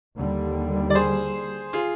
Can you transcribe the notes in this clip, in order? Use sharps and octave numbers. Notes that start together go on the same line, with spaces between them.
D#2 D3 G3
D5
G#4 C5
F4 G#4